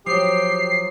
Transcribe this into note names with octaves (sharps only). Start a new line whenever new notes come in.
F3 F#3 G4 C#5 D#6 C7